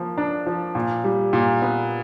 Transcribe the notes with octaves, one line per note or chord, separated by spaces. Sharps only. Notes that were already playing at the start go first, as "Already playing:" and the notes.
Already playing: F3 A#3
D4
F3
A#2
G3
A#2
B3